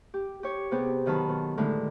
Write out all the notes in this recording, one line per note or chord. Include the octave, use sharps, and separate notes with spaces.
G4
G4 C#5
C3 B3 G4 G#4
B2 D#3 F#3 A5 B5
B2
A2 D3 D#3 G#3